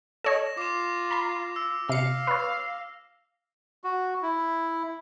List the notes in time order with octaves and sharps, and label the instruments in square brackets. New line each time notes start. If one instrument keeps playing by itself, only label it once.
[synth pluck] A4 C#5 D#5 [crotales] A#6 E7
[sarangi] F4 [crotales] D6 E7
[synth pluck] A#5 B5
[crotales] E6
[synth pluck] C3 C#7 [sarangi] F5
[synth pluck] B4 C#5
[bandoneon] F#4
E4